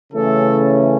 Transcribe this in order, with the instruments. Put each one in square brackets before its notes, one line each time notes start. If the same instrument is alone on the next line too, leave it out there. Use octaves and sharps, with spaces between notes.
[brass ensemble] C#3 E3 A3 C#4 A4